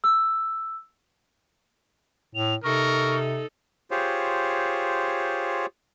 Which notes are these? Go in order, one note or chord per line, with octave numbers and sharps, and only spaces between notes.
E6
A2 F7
C3 D#4 A4 A#4 C#6
F4 G4 G#4 C5 C#5